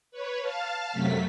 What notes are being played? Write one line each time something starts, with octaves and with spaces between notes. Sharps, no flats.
B4 C#5
F5 A5 F6
F#2 C3 F#3 A3 B6